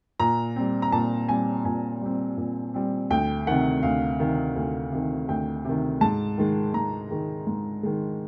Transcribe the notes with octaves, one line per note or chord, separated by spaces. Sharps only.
A#2 A#5
G3 C4
A#5
A#2 A5
G3 C4 G#5
A#2 G#5
G3 C4
A#2
G3 C4
D2 G5
C3 D#3 F#5
D2 F5
C3 D#3
D2
C3 D#3
D2 G5
C3 D#3
G#2 A5
D#3 G#3
G#2 A#5
D#3 G#3
G#2
D#3 G#3